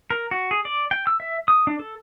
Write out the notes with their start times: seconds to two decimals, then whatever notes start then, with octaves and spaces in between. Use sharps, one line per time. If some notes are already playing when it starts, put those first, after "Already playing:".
0.10 A#4
0.31 F#4
0.51 G#4
0.65 D5
0.91 G5
1.07 E6
1.20 E5
1.48 D#6
1.67 D4
1.79 A4